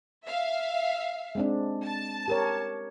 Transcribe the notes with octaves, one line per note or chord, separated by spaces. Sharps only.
E5 F5
G#3 C4 D4
A5
G4 A#4 C#5